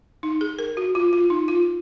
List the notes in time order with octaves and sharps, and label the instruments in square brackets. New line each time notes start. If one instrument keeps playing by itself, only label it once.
[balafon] D#4
G#4
A#4
F#4
F4
F4
D#4
F4